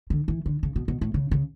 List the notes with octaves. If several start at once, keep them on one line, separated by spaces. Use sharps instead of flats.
D3
E3
D3
C#3
B2
B2
A2
C#3
C#3